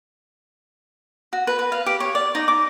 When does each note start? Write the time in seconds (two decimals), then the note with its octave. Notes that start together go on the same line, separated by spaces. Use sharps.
1.33 F#4
1.47 B4
1.59 B4
1.72 F5
1.86 G4
2.00 C#5
2.15 D5
2.35 D#4
2.48 D6